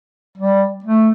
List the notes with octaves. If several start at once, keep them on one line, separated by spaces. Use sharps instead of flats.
G3
A3